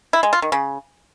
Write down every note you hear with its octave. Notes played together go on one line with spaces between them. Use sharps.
E4
G#3
F4
D#3
C#3